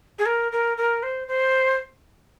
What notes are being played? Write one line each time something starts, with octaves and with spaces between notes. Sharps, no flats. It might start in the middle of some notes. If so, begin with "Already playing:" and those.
G#4
A#4
A#4
A#4
C5
C5